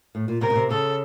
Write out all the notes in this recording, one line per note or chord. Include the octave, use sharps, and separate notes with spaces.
A2
A#2
C3 A#4
C#3
C3
C#3 A4